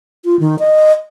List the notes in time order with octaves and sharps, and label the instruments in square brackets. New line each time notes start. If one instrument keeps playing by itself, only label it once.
[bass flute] F4
D#3
D#5